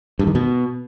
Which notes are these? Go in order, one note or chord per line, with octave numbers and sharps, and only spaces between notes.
G2
D#3
B2